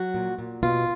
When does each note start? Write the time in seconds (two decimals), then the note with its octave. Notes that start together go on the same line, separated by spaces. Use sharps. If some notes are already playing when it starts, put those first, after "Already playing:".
Already playing: F#3 F#4
0.14 A#2
0.39 A#2
0.63 B2 F4